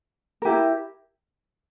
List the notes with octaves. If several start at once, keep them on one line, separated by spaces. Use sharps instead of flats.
E4 G4 A#4